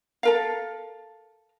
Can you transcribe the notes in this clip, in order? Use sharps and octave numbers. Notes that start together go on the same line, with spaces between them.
A4 A#4 F5